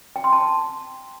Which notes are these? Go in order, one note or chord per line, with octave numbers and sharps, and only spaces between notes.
G5
C6
A5